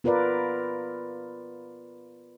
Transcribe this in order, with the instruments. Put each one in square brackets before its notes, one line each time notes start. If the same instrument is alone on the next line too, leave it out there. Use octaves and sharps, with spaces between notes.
[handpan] B3 F4 A#4 B4 D5